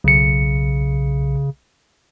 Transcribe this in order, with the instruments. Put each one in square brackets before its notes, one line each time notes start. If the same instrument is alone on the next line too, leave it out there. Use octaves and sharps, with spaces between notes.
[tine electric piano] B1 C#7 [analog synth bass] C#3